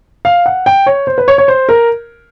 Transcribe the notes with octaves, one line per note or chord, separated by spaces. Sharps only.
F5
F#5
G5
C#5
C5
B4
C#5
C#5
C5
A#4